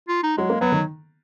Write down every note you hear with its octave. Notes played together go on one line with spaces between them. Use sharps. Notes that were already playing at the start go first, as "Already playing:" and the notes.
F4
D#4
F#3 G#3
A#3
F#3 B3
D#3